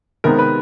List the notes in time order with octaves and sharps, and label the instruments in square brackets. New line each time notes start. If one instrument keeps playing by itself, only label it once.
[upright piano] C3 D#3 G#3 B3 A#4
B4